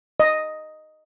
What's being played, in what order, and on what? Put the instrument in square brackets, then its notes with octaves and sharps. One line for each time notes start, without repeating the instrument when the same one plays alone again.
[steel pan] D#5